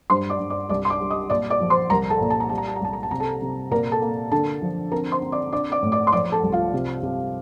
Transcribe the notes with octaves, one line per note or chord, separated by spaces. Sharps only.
G2 C5 C6
D5 D6
G2
D5 D6
C2 D5 D6
C6
D5 D6
G3
D#5 D#6
A#2 D5 D6
D5 D6
F3
C5 C6
C2 A#4 A#5
A4 A5
A#2
A5
A#5
G3 A5
A#5
A5
A#5
C2 A5
A#5
A5
C3 A#5
A4 A5
C3
A#2 A#4 A#5
A4 A5
A#3
D3 A4 A5
F3
C4 A#4 A#5
C5 C6
C4
D5 D6
D4 D5 D6
D5 D6
A2
D5 D6
C6
F3 D5 D6
A4 A5
C2
F4 F5
C3
C3